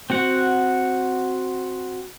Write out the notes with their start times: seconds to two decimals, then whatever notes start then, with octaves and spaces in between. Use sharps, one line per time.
0.10 C4 F#4 F#5